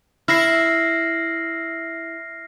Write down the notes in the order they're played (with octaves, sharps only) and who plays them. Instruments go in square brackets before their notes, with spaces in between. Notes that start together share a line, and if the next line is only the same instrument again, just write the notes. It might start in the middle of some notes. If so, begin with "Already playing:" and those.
[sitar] E4 [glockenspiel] F6 A#6 C7